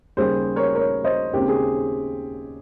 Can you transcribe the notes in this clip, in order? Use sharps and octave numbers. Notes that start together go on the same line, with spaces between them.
D#2 C#3 G3 G#4 C5
A#4 C#5
A#4 C#5
C5 D#5
D#2 C#3 G#3 C4 G4
G#4